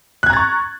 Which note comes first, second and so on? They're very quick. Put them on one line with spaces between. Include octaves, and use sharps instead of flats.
F#6 G#6 A#5 A6 C#6